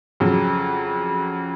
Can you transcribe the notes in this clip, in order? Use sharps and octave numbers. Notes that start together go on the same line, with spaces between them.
F2 C#3 F#3